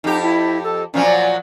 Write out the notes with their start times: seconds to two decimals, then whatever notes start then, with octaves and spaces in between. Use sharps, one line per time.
0.04 F2 D#4 G4
0.22 E4
0.64 A4
0.94 A#2 F3 F#3 C#4
1.05 D5